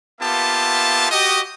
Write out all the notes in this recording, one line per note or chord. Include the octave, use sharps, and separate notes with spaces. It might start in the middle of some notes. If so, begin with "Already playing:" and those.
A#3 B3 F4 G4 E5 A5
F#4 G4 D#5